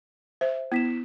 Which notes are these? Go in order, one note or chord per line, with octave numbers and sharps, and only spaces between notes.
C5 E5
B3 E4 B6 E7